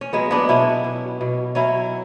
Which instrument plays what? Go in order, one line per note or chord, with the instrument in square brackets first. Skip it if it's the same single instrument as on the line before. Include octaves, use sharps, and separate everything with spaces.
[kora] C#4
F#3 G#3 B3
B3 D4
B2 C#4 E4
B2
B2
F#3 C#4 E4